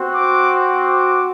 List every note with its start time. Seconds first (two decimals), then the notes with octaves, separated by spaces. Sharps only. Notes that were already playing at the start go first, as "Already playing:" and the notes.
Already playing: C4 F#4
0.15 D6
0.86 D6